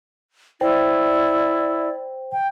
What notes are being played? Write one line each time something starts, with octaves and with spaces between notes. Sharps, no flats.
E4 C5 D5 G5
G5